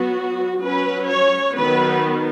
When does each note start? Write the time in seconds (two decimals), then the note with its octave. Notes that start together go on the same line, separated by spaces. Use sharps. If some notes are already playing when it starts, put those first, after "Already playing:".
Already playing: F#3 B3 F#4
0.61 F#3 C#4 B4
1.09 C#5
1.55 D#3 F#3 B3 B4